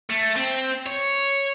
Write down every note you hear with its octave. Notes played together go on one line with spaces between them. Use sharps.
A3
C4
C#5